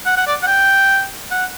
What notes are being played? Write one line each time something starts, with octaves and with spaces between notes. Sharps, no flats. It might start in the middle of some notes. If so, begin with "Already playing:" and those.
F#5
F#5
D5
F#5
G5
F#5